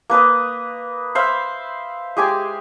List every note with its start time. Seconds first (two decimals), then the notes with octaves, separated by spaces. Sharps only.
0.10 A#3 B4 D#5 D#6
1.15 C5 E5 F5 B5
2.17 G#3 G4 G#5 D6